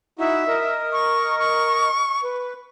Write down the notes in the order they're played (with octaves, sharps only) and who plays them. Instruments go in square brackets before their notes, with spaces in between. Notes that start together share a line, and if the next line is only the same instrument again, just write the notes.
[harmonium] D#4 E4 F#4 [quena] E5
[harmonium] A#4 D#5
[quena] C#6
C#6
[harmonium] B4